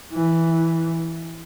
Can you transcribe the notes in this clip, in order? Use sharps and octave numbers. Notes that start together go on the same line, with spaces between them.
E3